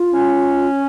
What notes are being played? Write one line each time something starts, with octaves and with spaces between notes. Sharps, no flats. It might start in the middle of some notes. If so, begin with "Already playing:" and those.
Already playing: F4
C#4